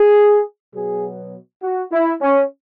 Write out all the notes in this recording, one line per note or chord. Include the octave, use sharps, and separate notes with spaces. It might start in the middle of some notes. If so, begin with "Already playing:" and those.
Already playing: G#4
B2 F#3 B3 G#4
F#4
E4
C#4